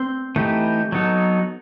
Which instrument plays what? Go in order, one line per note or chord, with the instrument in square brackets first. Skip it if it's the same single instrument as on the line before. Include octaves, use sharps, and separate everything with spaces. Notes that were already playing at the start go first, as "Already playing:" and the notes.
Already playing: [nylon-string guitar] C4 C5
[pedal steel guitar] E3 A3 D#4 G4 B4
F#3 B3 D#4 A4